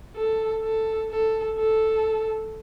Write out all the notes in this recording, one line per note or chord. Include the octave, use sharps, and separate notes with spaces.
A4
A4
A4
A4